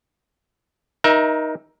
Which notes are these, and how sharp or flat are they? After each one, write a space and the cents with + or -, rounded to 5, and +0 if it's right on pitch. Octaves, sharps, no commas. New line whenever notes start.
D#4 +0 A#4 +30 E5 +0